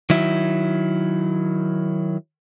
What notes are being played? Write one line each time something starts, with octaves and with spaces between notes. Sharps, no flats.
D#3 F#3 E4